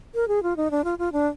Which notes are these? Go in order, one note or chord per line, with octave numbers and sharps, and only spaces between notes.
A#4
G#4
F4
D#4
D4
F4
F4
D4